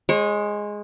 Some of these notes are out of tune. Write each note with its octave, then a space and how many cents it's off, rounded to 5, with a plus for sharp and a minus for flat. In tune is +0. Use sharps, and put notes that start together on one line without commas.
G#3 +0 C#5 -40